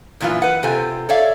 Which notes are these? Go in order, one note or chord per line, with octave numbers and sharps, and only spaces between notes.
F#2 A#2 E3 B3 F4
B4 F#5
C3 C4 F4 G4 A4 G#5
A4 C#5 D5 E5 F5